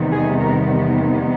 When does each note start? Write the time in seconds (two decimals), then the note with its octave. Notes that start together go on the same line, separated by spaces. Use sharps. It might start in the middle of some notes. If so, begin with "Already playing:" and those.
Already playing: E2 C3 D#3 G3 B3
0.11 G#4
0.39 A#4